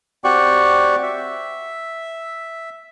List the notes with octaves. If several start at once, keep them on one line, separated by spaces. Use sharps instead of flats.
C4 F#4 G4 D5 C#6
E5